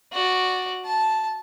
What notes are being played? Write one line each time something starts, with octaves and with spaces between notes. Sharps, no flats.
F#4 D5
A5